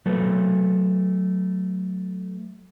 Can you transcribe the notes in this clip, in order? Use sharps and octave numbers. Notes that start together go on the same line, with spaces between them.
F#3 A3 A4 B4